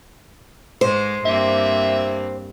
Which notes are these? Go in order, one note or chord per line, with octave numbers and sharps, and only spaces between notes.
G#2 G#3 C5
G2 A#3 C4 E5